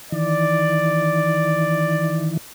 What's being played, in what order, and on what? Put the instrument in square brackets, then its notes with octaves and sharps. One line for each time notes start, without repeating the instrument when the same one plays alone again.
[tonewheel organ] D#3 E3 [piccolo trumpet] D5